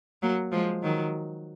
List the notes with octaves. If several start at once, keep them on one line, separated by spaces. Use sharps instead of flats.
F#3 A#3
F3 G#3
D#3 F#3